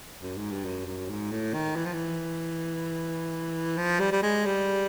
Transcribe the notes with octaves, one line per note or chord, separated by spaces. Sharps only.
F#2
G#2
G2
F#2
F#2
G#2
A2
D#3
E3
F3
E3
F3
G3
G3
G#3
G3